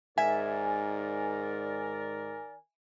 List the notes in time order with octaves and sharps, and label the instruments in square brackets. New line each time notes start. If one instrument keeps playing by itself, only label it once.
[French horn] G#2 [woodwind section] D#3 A#4 D5 [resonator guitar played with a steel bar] E5 [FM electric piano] G#5